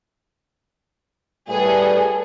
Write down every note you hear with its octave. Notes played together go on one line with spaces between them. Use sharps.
A2 G3 G#4 A4 B4